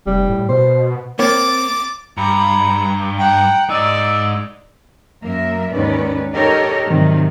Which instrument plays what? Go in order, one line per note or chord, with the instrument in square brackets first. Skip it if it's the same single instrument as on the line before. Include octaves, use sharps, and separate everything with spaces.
[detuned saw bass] F1 [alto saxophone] G3
[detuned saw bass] A2
[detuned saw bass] B2 [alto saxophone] C5
[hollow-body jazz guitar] A#3 C4 C#5 [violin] D6 A6
[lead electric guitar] G2 [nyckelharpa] A#5 [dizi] B5
[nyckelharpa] F#5 A#5 [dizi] G5
[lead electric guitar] G#2 D#4 [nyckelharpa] D5 D#5 [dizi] E6
[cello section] F#2 A#3 A#4 E5
D#2 G#2 D#3 C#4 B4 D5
D#4 G4 A4 A#4 C#5 D#5
G#2 C3 D#3 F#3 G3